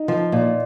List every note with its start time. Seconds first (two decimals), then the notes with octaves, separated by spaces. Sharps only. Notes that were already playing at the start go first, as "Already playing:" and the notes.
Already playing: D#4
0.08 F3
0.32 A#2